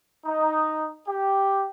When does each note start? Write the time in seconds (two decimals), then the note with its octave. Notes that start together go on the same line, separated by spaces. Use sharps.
0.24 D#4
1.06 G4